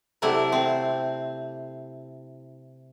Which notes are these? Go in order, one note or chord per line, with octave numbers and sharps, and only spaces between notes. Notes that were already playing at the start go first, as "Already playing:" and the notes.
C3 F#3 A3 E4 D5
C4